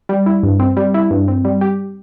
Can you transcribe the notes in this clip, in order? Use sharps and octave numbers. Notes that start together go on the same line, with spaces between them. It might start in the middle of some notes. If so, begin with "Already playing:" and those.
G3
E4
G2
C4
G3
E4
G2
C4
G3
G4